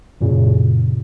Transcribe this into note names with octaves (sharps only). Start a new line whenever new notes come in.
F#2 A#2 C#3